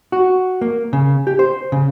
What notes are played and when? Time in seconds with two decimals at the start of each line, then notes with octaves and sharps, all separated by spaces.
0.12 F#4
0.61 A#3
0.93 C#3
1.27 G4
1.39 C5
1.72 C#3